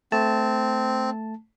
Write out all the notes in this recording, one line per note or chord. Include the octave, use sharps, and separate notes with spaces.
A3 C4 A5